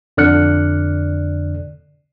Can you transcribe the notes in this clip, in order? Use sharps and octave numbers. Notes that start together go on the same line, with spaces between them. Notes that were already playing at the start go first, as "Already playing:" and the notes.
F2 D3 D5 F6 F#6 C#7